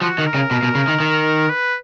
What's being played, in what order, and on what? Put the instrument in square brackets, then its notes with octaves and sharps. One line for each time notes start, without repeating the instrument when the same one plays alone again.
[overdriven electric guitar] F3 [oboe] F#4
[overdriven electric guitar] D#3
[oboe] A#4
[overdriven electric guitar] C#3
B2
B2
C#3
D#3
D#3
[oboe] B4